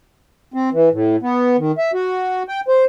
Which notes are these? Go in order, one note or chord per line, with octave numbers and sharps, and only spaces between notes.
C4
E3
A2
B3
D#3
E5
F#4
G5
C5